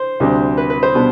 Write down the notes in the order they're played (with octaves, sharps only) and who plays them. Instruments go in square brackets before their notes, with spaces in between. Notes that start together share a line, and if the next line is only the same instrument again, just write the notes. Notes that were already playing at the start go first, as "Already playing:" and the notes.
Already playing: [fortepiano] C5
D2 C3 G3 D4
B4
B4
C5
B2 G3 B3 D4